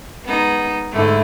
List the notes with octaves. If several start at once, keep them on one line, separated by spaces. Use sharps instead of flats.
G#3 B3 D#4
G#2 D3 A3 E4